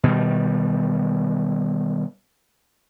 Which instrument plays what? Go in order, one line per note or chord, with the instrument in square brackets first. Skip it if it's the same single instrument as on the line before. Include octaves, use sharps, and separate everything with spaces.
[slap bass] B2 D#3 G3